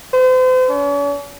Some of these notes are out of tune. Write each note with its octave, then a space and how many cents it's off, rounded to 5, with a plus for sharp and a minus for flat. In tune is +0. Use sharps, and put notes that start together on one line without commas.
C5 -40
C#4 +45